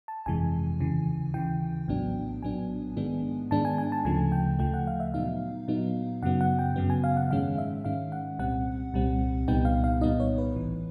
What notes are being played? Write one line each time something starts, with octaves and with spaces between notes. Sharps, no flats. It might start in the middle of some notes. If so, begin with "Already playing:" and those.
A5
G1 F2 C3 E3 G#3 G#5
D#2 C#3 E3
D#2 C#3 E3 G5
A#1 A2 F#3 B3 D4
A#1 A2 F#3 B3 D4 G#5
G#2 D#3 G#3 B3 D4
G#2 D#3 G#3 B3 D4 A5
G#5
G#5
A5
D2 C#3 F3 A3 G#5
G5
D2 C#3 F3 A3 G5
F#5
F5
E5
A#2 F#3 B3 D#4 F5
A#2 F#3 B3 D#4
F#2 C#3 F#3 B3 F#5
F#5
G5
F#2 C#3 F#3 B3
G#5
F5
F#5
G#2 D#3 G#3 C#4 F5
E5
G#2 D#3 G#3 C#4 F5
F#5
C2 A#2 G3 C4 F#5
C2 A#2 G3 C4
C2 A#2 G3 B3 D#4 G5
F5
F5
C2 A#2 G3 B3 D#4 D#5
C#5
B4
A1 A2 E3